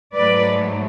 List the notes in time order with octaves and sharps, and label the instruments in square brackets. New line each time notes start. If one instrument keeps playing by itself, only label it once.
[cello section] G#2 F#3 A3 B4 D5